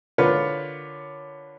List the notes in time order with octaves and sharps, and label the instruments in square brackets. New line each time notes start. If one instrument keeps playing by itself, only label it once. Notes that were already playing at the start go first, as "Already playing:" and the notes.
[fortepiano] D3 F4 A#4 B4 C#5